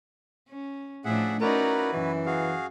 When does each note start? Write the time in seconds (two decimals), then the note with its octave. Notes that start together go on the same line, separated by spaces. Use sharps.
0.49 C#4
1.05 A2 F3 D4 G#4 E5 F#5
1.41 C#4 D#4 E4 F#4 A#4 B4 D5
1.93 F#2 E3
2.26 F#4 G#4 F5